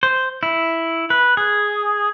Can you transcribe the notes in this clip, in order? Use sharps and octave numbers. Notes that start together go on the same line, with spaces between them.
C5
E4
B4
G#4